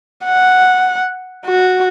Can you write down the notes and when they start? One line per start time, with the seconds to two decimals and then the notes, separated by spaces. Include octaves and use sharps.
0.24 F#5
1.46 F#4